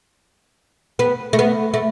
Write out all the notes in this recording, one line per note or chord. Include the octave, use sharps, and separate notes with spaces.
B3
A3
B3
A3